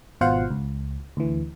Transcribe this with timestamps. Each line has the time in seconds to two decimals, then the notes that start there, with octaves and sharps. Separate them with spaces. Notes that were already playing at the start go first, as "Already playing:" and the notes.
0.21 G#1 B2 F4 C5 F5 F#5
0.50 C#2
1.17 D2 E3